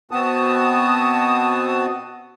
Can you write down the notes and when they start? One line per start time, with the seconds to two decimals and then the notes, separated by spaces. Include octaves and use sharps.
0.11 B2 B3 C4 F#4 A5 D#6